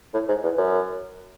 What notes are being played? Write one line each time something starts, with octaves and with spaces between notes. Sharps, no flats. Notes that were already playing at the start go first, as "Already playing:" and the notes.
A2
G#2
E2
F#2